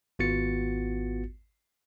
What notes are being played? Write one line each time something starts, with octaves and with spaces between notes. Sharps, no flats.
G#1 B3 F4 F#4 A6 C#7